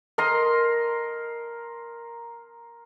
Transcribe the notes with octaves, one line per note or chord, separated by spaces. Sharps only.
A#4 D#5 A#5 C6